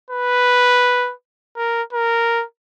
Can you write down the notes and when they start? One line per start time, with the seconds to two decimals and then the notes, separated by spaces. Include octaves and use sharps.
0.10 B4
1.57 A#4
1.93 A#4